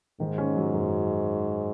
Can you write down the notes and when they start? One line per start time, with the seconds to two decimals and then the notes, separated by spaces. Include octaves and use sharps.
0.20 G#2 D#3
0.38 C#4
0.57 F#3
0.74 F#2